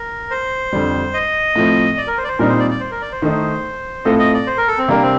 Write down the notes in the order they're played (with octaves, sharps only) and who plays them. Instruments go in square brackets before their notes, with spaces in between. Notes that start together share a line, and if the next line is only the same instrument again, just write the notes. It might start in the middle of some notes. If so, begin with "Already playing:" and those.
Already playing: [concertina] A#4
C5
[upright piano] F2 D3 G3
[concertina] D#5
[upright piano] A2 F3 A3 C4
[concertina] D5
A#4
C5
D5
C5
[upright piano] A#2 G3 C4 D#4 [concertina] A#4
[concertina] C5
D5
D5
C5
A#4
D5
C5
[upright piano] D#3 A3 D#4
[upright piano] A2 A3 C4 F4 A4 [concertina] D#5
[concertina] D#5
D5
C5
A#4
A4
C4
[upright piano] C3 G3 D4 G4 A#4 [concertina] A#3
[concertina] C4